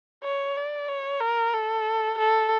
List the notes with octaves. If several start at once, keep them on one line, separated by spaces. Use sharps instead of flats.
C#5
D5
C#5
A#4
A4
A4